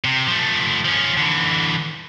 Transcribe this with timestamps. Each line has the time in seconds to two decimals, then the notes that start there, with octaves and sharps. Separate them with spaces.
0.04 C3
0.27 F3 A3
0.85 F3 C#4
1.17 D3 E3